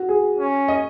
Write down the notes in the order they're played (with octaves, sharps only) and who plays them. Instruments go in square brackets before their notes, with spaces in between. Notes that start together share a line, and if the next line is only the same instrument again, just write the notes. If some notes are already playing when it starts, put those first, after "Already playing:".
Already playing: [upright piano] F#4
G#4
[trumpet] C#4
[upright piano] D#5